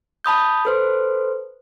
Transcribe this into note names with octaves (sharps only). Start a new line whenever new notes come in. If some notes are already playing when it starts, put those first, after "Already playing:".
A5 B5 D#6 G6
A4 B4 C5